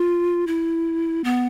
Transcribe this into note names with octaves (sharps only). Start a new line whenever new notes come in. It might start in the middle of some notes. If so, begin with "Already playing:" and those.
Already playing: F4
E4
B3